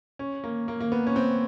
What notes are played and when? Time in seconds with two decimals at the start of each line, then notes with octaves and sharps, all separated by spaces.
0.19 C#4
0.44 A#3
0.68 A#3
0.80 A#3
0.92 B3
1.07 C#4
1.16 C4